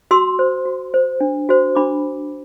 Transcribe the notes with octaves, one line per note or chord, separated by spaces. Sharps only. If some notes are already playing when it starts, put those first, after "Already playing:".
F#4 C6 E6
C5
F#4
C5
D4
F#4 C5
D4 B5 D6